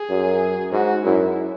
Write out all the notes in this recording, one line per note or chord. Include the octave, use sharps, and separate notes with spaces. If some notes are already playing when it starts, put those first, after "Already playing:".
Already playing: G#4
F#2
G#2 F#4
F#2 E4